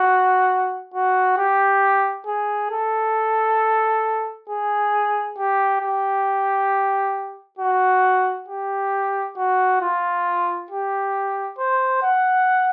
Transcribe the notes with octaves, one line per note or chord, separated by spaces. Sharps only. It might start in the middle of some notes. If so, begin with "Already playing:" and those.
Already playing: F#4
F#4
G4
G#4
A4
G#4
G4
G4
F#4
G4
F#4
F4
G4
C5
F#5